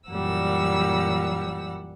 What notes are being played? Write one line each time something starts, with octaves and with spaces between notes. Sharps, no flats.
F#2 A#2 E3 G3 F#5 E6